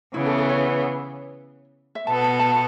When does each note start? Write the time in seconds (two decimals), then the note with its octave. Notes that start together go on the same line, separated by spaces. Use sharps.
0.14 C#3 E3 B3 E4
0.26 A4
0.38 A4
0.49 C#5
1.95 E5
2.07 B2 B3 A4 A5
2.24 A5
2.39 A5